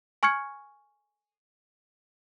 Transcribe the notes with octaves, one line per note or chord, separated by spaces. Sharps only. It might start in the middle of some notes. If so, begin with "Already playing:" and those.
G#5 C#6 F6 G#6 C#7